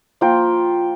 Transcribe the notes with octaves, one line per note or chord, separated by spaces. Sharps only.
F3 A#3 F4 G5